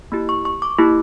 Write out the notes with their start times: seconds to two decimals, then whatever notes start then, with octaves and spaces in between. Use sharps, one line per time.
0.12 A#3 E4 G4
0.29 C#6
0.45 C#6
0.62 D6
0.79 A#3 E4 G4